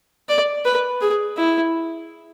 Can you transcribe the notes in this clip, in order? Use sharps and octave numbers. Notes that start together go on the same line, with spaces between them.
D5
B4
G#4
E4